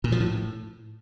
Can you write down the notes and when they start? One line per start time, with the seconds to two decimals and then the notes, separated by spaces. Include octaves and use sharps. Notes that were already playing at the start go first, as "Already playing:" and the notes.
0.04 A#2
0.12 F3
0.20 A2